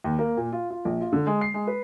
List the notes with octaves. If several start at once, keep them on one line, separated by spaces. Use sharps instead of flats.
D#2
A#3
A#2
F4
F4
A#1
F4
D3
G#3
C7
G#3
B4